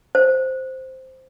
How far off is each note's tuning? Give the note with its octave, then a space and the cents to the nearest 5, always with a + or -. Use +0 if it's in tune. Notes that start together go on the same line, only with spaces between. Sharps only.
C5 +0